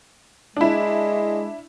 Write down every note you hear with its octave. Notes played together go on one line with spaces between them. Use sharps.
G#3 D4 E4